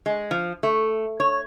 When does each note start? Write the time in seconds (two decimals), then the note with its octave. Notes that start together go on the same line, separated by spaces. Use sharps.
0.06 G#3
0.31 F3
0.63 A3
1.20 C#5